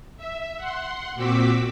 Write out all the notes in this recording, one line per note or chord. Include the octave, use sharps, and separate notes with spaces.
E5
F#5 C6
A#2 C4 F#4 D6 E6 B6